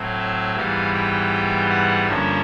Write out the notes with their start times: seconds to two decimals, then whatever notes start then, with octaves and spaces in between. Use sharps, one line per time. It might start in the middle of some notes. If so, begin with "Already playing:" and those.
Already playing: A2 F#3 A3 C4
0.19 E5
0.56 G#2 E3 G3 B3 F5
0.94 G5
1.70 F#5
2.07 G2 D3 F3 A#3 C#4 E5